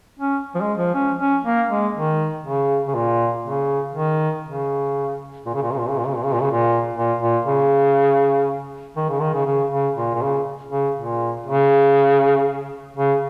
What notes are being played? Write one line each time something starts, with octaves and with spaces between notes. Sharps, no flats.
C#4
F3
G#3
F3
C#4
C#4
A#3
G#3
D#3
C#3
C#3
A#2
C#3
D#3
C#3
A#2
C#3
A#2
C#3
A#2
C#3
A#2
C#3
A#2
C#3
A#2
C#3
A#2
A#2
A#2
C#3
D#3
C#3
D#3
C#3
C#3
C#3
A#2
A#2
C#3
C#3
A#2
C#3
C#3